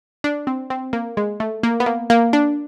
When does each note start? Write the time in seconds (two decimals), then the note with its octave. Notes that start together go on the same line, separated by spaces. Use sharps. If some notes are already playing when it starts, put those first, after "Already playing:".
0.24 D4
0.47 C4
0.70 C4
0.93 A#3
1.17 G#3
1.40 A3
1.63 A#3
1.80 B3
1.86 A#3
2.10 A#3
2.33 D4